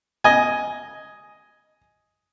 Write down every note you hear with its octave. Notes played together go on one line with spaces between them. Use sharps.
D#5 G#5